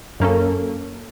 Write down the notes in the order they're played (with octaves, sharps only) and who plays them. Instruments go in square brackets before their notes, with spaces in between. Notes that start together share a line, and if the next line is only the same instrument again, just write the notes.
[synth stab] F#2 A#3 C#4 A4